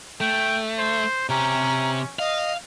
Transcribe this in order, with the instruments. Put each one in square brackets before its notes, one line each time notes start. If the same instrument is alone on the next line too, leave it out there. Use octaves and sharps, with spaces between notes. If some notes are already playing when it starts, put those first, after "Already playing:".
[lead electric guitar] A3 [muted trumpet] G5
[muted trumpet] C5
[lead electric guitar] C3 G4 [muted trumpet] C#4 [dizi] A#5
[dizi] D#5 [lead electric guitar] F5